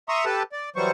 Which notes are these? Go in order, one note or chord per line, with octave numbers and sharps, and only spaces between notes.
E5 A#5 C6 C#6 D#6
G4 A4 B4 A5
D5
E3 F#3 G3 C5 C#6